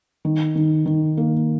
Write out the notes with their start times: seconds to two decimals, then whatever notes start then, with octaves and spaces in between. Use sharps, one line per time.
0.25 D#3
0.55 D#3
0.86 D#3
1.17 A#3